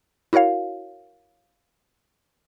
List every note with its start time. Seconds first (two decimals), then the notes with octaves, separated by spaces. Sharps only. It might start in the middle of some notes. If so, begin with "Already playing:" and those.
0.33 E4 F#4 A#4 C#5 F5